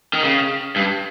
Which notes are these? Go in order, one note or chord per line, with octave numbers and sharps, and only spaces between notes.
D#3
C#3
G2